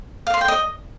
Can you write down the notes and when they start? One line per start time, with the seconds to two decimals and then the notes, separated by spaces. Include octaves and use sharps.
0.27 F5
0.34 C6
0.41 G5
0.48 D#5